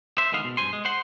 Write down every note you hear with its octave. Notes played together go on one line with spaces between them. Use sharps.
C5 E5
D2 D#3 G#3 B3 F5
B2
G2 B2 C5 G#5 C6
G#3
C5 F#5 C6